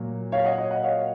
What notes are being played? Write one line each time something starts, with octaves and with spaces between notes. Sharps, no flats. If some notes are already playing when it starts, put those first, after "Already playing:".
Already playing: A#2 F#3 A#3
C#5 F5
D#5 F#5
D#5 F#5
D#5 F#5
C#5 F5